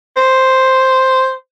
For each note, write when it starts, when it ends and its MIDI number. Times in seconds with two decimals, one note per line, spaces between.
0.17 1.32 72